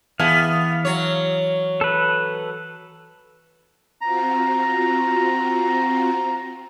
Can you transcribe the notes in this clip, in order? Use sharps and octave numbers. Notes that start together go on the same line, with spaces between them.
E3 B3 G#4 F5 A5
F#3 C#5
A4 B4
C4 F4 F#4 A#5